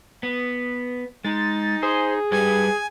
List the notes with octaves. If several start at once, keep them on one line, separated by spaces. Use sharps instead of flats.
B3
G#3 D#4 A6
G#4 C5
G3 G4 B4 G#5